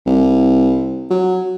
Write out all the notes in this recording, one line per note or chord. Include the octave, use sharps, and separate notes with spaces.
C2
F#3